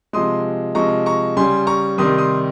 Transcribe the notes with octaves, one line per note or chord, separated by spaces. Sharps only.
C3 F3 G#3 C6 D#6
C3 F3 G#3 A#5 C#6
A#5 C#6
C#3 G3 G#5 C6
A#5 C#6
C3 D#3 G3 C6 D#6
C6 D#6